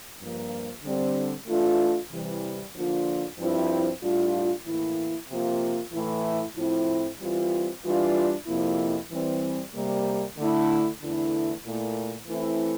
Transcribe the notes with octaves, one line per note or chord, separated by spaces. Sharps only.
G2 F3 A#3
D3 G3 C4
E3 A3 D4 F4
C3 E3 G3
D3 F3 A#3 D4 F4
G2 F3 C4 E4
A2 G3 D4 F4
A2 E3 A#3 E4
C3 F3 A#3 F4
A2 E3 A3 E4
A2 F3 C4 E4
E3 G3 C4 F4
E3 G3 D4 F4
F2 C3 F3 A#3 E4
E3 G3 C4
C3 G3 A#3
D3 A3 E4
E2 D3 A3 E4
A#2 A3 E4
E3 A3 C4 E4